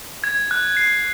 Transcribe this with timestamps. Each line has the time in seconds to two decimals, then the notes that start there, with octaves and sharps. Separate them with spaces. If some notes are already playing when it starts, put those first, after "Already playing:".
0.24 G#6
0.51 F#6
0.77 C7